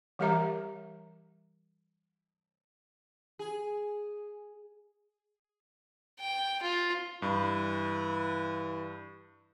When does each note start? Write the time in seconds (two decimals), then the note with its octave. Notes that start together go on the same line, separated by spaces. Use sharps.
0.19 E3 G3 G4 A#4 E5 A#5
3.39 G#4
6.19 G5
6.62 F4
7.22 G2 E3